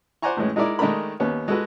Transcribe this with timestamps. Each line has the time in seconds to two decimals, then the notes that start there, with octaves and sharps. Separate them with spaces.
0.22 C5 D5 F#5 G#5 A#5 C#6
0.37 A2 E3 G#3 C#4
0.56 G#3 D#4 E4 A#4 D5
0.79 D#3 G#3 A3 D4 A#4 B5
1.20 D#2 B3 C#4
1.48 G#3 F#4 A4 B4